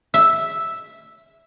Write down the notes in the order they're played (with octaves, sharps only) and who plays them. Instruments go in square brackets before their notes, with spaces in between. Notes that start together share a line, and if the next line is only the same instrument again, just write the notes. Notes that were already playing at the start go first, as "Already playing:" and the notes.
[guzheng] E5